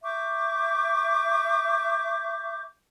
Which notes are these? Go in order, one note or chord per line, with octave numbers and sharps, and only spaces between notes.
E5 C#6 D6 G6